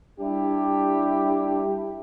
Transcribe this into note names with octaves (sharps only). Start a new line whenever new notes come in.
G3 D4 E4 G4